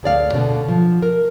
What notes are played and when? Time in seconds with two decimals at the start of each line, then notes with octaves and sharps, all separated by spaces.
0.03 D2 G#4 D5 F5
0.33 B2 D3 B3
0.68 F3
1.02 A#4